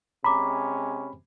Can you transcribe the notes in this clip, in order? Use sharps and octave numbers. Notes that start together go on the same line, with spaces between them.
C3 G#3 C#4 A#5 B5 D6